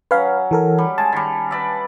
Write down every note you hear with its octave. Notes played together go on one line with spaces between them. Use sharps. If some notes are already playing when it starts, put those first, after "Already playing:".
F#3 C#4 B4 F5
E3 A4 A#4
G3
G#3 G#5 A5
D#3 G3
B4 D5 E5